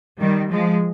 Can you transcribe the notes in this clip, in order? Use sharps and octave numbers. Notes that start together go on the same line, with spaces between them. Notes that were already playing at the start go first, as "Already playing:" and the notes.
D#3 G3
F3 G#3